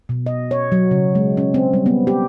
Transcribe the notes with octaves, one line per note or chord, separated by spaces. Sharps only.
B2
D#5
C#5
F#3
C#3
G#3
C#4
C4
G3
B3
G4